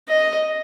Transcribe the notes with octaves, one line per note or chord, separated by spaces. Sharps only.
D#5